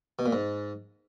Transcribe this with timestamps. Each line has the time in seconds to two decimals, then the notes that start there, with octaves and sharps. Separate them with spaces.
0.19 B2
0.26 A#2
0.33 G#2